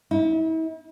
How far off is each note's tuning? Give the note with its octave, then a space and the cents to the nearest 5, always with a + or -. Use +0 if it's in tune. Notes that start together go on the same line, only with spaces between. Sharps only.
E4 -40